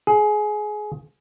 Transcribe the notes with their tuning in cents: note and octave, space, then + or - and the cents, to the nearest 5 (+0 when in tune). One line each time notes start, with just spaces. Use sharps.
G#4 +20